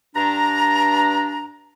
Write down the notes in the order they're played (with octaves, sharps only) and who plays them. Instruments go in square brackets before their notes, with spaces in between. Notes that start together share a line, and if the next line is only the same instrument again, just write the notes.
[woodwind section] G2 D4 A#5